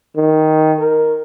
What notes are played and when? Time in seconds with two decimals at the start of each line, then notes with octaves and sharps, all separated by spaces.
0.16 D#3
0.80 A#4